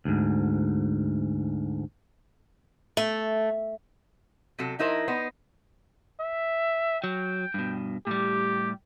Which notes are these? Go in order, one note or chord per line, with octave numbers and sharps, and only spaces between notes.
D2 G#2
A3
C3 F#3 A4
F3 D#4 E4 A#4 C5
B3 D#4 C5
E5
F#3 G5
G2 B2
A2 G3 G4